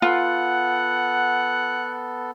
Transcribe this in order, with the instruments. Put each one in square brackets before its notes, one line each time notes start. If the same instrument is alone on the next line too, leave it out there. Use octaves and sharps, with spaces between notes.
[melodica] B3 A4 [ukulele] F4 [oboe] F#5